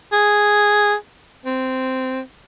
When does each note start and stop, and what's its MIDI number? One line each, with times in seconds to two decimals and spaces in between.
0.13 0.95 68
1.45 2.20 60